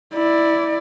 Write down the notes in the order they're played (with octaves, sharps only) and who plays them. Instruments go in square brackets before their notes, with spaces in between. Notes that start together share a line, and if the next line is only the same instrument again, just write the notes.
[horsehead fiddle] E4 D5